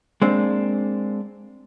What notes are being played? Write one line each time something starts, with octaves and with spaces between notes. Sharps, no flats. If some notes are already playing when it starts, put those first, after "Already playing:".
G#3 A#3 C4 D4